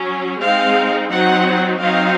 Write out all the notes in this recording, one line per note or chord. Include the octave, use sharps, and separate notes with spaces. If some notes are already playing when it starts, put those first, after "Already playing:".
Already playing: F#3 C#4
G#3 C4 D#4 F5
F#3 C4 D#4 F#5
F#3 C4 D#4 F5